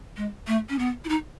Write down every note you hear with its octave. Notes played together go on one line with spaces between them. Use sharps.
G#3
A3
C#4
B3
E4
D#4